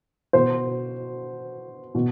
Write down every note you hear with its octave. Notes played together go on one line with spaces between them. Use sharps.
B2 C5
B2